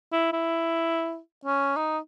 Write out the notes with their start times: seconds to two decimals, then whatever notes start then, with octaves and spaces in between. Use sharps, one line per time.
0.12 E4
0.33 E4
1.45 C#4
1.76 D#4